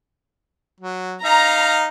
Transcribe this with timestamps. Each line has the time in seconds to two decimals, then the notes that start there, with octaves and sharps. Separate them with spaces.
0.80 F#3
1.24 D#4 F5 A#5